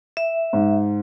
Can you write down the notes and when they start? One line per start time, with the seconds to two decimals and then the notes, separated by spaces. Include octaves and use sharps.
0.17 E5
0.53 G#2